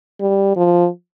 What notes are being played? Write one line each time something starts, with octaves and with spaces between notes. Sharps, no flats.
G3
F3